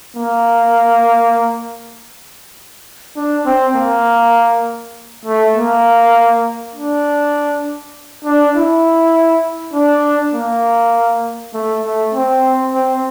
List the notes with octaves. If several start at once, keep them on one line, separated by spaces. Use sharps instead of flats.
A#3
D4
C4
A#3
A3
A#3
D4
D4
E4
D4
A#3
A3
A3
C4
C4